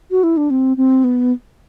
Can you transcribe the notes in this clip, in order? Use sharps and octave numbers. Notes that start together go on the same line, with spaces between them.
F#4
E4
D4
C4
C4
B3